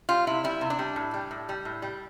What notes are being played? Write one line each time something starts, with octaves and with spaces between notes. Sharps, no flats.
G3 F4
C3 E4
G3 E4
C3
D4
G3
A2
G3
A2
G3
A2
G3